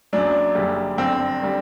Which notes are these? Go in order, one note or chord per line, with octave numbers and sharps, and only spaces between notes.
F#1 F#2 F#3 D4
F#1 F#2 D3 G3
G1 F#2 D3 C4
D3 G3